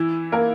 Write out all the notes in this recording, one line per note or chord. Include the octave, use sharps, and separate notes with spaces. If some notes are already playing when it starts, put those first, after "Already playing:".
Already playing: E3 E4
A#3 A#4